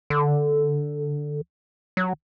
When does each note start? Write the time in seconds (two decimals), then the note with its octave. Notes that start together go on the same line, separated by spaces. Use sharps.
0.10 D3
1.97 F#3